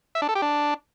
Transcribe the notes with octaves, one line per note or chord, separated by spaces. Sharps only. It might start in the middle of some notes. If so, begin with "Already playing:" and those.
E5
D4
A4
G4
D4